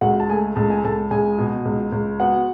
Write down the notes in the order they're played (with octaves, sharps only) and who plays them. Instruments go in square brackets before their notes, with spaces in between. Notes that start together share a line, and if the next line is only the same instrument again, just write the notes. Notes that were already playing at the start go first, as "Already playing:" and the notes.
[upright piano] C#2 F#4 F#5
A5
A3 G#4 G#5
C#2 A5
G#5
C#2 A4 A5
C#2 G#4 G#5
B2
C#2
C#2
B3 F#4 F#5